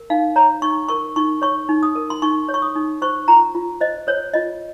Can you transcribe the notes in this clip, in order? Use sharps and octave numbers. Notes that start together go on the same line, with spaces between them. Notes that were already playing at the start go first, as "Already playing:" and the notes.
Already playing: A#4
D#4 F5
C#5 A#5
D#4 C#6
A#4 C#6
D#4 C#6
C#5 C#6
D#4
D#6
A#4
C6
D#4 C#6
C#5
C#6
D#6
D#4
C5 C#6
F4 A#5
F4
C5 D#5
C5 C#5
F4 D#5